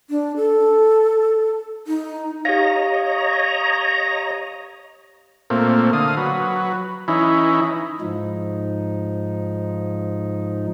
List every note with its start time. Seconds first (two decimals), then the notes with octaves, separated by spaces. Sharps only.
0.10 D4
0.37 A4
1.87 D#4
2.45 G4 C#5 D#5 F5 A#5
5.50 A#2 A3 A#3 C4
5.93 D3 F5 D#6
6.17 F#3 B4
7.08 E3 C#4 D#4 E4
8.01 G#2 F3 D#4